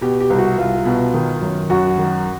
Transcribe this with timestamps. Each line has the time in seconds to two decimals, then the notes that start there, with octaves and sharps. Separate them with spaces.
0.01 B2 G4
0.20 G4
0.30 C2
0.38 F#4
0.58 C2 F4
0.85 B2
1.14 D#3
1.41 F#2
1.69 F#2 F#4
1.98 D#3